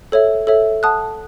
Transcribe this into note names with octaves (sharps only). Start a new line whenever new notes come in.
A4 C#5 E5
A4 C#5 E5
F#5 A5 D#6 F#6